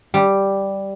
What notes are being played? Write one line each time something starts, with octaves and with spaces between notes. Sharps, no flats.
G3